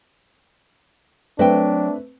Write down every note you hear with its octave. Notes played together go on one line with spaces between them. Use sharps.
F#3 A3 C4 D4 B4 G5